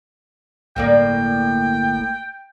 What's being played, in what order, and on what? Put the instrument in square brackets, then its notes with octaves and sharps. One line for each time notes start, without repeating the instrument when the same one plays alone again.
[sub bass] G1 [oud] A2 A#3 D5 [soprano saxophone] G5